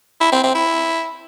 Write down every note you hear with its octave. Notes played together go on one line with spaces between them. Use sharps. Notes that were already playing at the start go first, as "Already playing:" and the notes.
E4
C4
C4
E4